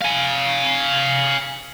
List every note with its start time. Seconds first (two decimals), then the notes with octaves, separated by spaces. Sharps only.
0.02 F5 G#5